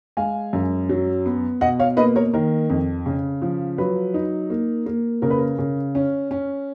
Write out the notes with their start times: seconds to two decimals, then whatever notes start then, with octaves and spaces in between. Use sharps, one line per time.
0.17 G#3 F5 G#5
0.53 F#2
0.89 F#3
1.26 B3
1.61 B2 D#5 F#5
1.79 C#5 F5
1.97 A#3 B4 D#5
2.16 A#4 C#5
2.34 D#3 A#4
2.70 F2
3.06 C#3
3.42 F3
3.78 F#3 B4
4.14 D#4
4.50 A#3
4.86 A#3
5.22 C#3 A#4
5.30 B4
5.38 A#4
5.59 C#3
5.95 C#4
6.31 C#4